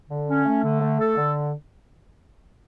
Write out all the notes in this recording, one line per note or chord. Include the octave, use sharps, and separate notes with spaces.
D3
C#4
A3
D3
A3
A4
D3